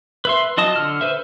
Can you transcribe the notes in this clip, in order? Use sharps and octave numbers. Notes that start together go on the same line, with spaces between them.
B4 E5 C6
F#3 F4 D#5 A5 D#6
D3 E6 F6
B4 C5 E5